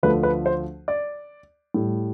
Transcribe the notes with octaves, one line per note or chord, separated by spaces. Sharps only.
D2 D3 F3 A3 B4
B4
C5
D5
A2 G3